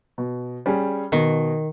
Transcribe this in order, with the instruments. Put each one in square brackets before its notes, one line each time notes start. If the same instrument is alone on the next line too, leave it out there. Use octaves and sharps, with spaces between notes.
[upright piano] B2
G3 C#4 G#4
[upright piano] B2 [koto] D#3